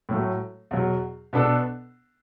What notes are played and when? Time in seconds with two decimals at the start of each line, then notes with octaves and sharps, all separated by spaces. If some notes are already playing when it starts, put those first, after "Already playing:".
0.09 A2 F#3 A3
0.71 E2 B2 F#3
1.33 B2 B3 D4 A4